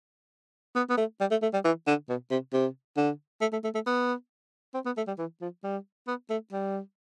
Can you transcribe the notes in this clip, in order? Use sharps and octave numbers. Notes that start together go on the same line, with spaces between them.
B3
B3
A3
G3
A3
A3
G3
E3
D3
B2
C3
C3
D3
A3
A3
A3
A3
B3
C4
B3
A3
G3
E3
F3
G3
B3
A3
G3